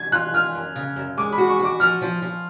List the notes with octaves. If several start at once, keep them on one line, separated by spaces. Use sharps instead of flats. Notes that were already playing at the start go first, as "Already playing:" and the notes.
Already playing: G#6
F4 F#6
F4 F6
F#2
C#3
F#2
G#3 D6
B5
F#4
C#6
F#4 D6
F3 F6
F3
F3